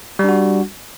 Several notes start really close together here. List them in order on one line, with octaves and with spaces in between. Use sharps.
G3 D4 F#4